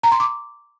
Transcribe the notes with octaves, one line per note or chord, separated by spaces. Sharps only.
A#5
C6
D6